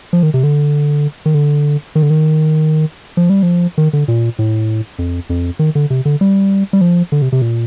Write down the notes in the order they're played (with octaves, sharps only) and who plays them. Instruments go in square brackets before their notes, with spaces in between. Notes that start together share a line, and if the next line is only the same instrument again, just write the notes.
[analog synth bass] F3
D#3
C3
D3
D#3
D3
D#3
D3
D#3
F3
G3
F3
D#3
D3
A#2
A2
F2
F2
D#3
D3
C3
D3
G3
G3
F3
D3
C3
C3
A#2